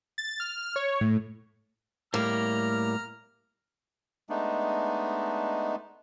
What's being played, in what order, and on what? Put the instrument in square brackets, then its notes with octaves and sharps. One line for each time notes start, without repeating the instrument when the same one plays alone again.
[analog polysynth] A6
F6
C#5
A2
[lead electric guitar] A2 G3 [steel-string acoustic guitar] A#3 [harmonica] A#5 F6
[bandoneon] G#3 A3 B3 D4 D#4